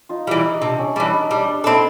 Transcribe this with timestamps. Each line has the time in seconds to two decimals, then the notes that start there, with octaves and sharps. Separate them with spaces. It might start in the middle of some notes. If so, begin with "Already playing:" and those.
0.09 D#4 F4
0.27 E3 G3 E4
0.45 D#4
0.61 C3 D4
0.79 C#4
0.96 E3 G3 D4
1.13 D#4
1.30 G3 D4
1.48 D4
1.64 C4 D#4 E4 A4